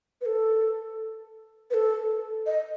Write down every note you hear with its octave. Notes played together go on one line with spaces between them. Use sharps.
B4
A4
B4
A4
D#5